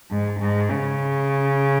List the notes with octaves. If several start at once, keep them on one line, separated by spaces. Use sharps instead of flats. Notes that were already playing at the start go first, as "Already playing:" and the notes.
G#2
G#2
C#3